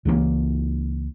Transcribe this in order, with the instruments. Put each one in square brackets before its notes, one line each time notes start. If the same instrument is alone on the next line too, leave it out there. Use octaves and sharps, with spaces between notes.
[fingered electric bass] C#2 E3 F#3 A#3